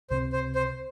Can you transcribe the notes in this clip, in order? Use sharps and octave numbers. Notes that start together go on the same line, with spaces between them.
C#2 C3 F3 C4 C5
C5
C5